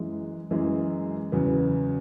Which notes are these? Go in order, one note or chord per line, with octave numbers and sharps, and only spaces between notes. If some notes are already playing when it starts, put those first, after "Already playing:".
Already playing: F#2 E3 G#3
F#2 E3 G#3
E2 C#3 F#3 B3